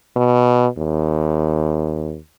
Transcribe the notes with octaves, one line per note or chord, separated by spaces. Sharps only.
B2
D#2